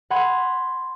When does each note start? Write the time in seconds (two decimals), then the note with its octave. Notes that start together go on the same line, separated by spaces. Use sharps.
0.10 F#5 B5 C6 G#6